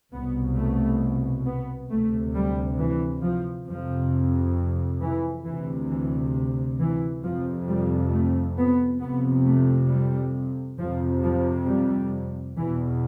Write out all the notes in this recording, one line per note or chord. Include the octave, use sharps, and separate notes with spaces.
C2 B2 B3
A3
B3
D2 C3 A3
G3
E3
F3
F2 C3 F3
E3
D2 C3 E3
E3
E3
F2 C3 F3
G3
A3
B3
F2 C3 B3
A3
G3
F2 C3 F3
F3
G3
E2 B2 E3